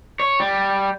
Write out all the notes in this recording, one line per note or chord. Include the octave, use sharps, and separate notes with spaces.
C#5
G3